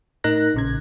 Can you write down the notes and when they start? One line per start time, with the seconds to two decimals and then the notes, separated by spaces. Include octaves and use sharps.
0.24 A2 D#4 A#4 F#6 A#6
0.54 A#1 C#3 G#6